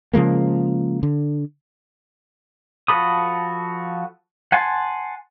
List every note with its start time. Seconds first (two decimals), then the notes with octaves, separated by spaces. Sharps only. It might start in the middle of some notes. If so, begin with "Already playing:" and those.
0.13 C#3 F3 G#3 A#3
1.03 D3
2.88 F3 F#4 A4 B5 D#6
4.52 F#5 G#5 A5 C6